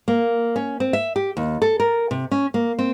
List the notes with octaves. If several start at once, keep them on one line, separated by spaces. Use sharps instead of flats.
A#3
C#4
C4
E5
G4
D#2
A4
A#4
C3
C#4
A#3
C4